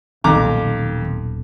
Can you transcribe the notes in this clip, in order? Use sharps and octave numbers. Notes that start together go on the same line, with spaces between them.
D#1 B1 F2 D#3 A#5 D6